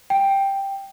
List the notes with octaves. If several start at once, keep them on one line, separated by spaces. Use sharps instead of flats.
G5